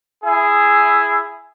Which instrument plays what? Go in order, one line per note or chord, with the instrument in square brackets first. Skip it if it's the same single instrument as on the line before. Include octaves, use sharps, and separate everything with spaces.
[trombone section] E4 G#4